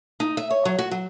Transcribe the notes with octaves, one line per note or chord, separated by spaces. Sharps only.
D#4
E5
C#5
F#3
F#4
F#3